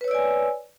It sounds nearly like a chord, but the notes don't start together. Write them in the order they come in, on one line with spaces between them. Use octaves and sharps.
B4 C#5 E6 D5 G#5